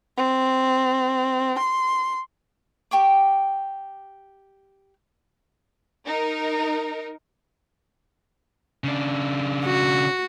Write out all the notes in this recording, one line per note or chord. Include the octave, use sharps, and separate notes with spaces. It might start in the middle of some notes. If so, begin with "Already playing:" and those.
C4
C6
G4 G5 C#6 D6
D#4 A#4
C#3 D4
F#4